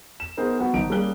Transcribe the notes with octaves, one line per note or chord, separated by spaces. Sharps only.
E7
B3 D#4 G#4 A#4 C5
B3 F#4 B4 F#5
G#1 D#4 D7
G3 A#3 C#4 G#4 F#6 G7